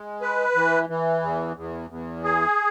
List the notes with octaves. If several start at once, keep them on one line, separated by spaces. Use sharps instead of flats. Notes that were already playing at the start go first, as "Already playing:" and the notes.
Already playing: G#3
B4
E3
E3
E2
E2
E2
G#4